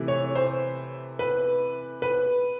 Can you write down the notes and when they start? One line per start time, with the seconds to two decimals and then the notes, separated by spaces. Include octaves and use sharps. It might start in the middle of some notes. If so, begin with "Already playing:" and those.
Already playing: C3 E3 A3
0.08 C#5
0.35 C5
1.19 B4
2.02 B4